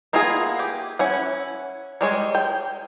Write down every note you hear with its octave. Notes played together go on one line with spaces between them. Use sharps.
A#3 B3 E4 F4 G#4
G4
C#4 E4 F#5
G3 G#3 C#5
G5